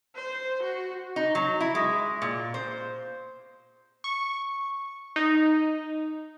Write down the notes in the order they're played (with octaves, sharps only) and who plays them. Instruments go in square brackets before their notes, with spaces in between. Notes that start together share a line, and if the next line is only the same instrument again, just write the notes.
[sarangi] C5
F#4
[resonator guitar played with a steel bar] D#4
F#3
E4
G#3
A#2
C5
[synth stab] C#6
D#4